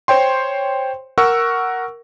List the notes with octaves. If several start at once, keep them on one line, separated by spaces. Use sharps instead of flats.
C5 C#5 G5 C6
A#4 F#5 C#6 E6